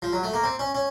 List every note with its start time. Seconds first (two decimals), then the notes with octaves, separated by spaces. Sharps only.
0.02 F3
0.13 F#3
0.23 A3
0.34 A#3
0.44 C4
0.59 C#4
0.75 C#4